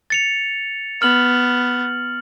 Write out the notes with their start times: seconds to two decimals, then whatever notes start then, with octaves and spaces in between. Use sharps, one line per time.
0.10 A6 C#7 F7
1.02 B3 F6 F#7